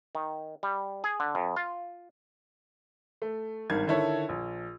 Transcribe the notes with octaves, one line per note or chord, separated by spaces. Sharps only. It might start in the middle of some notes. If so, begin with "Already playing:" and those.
D#3
G3
G#4
D3
F2
F4
A3
G#1 G2 D#3 G#6
D3 D#3 E4 A4 C#5
A#1